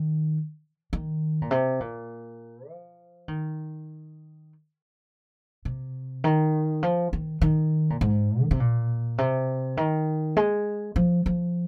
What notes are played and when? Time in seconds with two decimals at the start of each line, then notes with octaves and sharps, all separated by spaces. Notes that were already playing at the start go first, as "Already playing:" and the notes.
Already playing: D#3
0.93 D#3
1.42 A#2
1.51 C3
1.80 A#2
2.69 F3
3.28 D#3
5.65 C3
6.24 D#3
6.83 F3
7.13 D#3
7.41 D#3
7.90 A#2
8.01 G#2
8.42 D#3
8.51 C3
8.60 A#2
9.18 C3
9.77 D#3
10.37 G#3
10.96 F3
11.26 F3